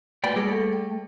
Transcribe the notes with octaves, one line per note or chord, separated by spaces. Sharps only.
A3 A#3 B4 D5 G5 B5
G3 A3 G#4 D6 G#6 A#6
A4
G5